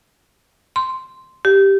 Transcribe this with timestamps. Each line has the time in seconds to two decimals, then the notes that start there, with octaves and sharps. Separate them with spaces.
0.76 C6
1.45 G4